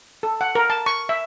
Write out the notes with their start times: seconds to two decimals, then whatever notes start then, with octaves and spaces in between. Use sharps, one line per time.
0.23 A4
0.41 F#5
0.55 A#4
0.70 A5
0.86 C#6
1.09 E5